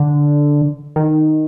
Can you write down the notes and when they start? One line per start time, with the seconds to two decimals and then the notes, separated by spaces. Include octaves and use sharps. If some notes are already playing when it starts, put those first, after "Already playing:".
Already playing: D3
0.96 D#3